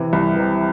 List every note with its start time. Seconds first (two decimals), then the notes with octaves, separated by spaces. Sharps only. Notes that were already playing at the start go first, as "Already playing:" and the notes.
Already playing: C3 E3
0.13 C2
0.36 C3 E3